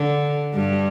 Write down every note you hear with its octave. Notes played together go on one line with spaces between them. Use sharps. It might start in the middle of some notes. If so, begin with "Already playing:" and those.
Already playing: D3
G2 G3